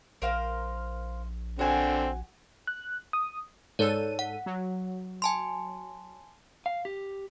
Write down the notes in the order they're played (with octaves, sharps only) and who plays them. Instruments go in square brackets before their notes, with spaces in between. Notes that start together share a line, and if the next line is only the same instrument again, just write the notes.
[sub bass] A#1 [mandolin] A#4 C5 F5
[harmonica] D3 C4 [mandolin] F#4 G#5
[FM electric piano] F#6
D#6
[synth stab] G#2 A4 D#7 [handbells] C#5 D5
[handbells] F#5
[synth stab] F#3
[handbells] G#5 A5 C6
[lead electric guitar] F5
G4